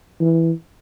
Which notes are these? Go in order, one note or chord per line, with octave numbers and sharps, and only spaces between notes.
E3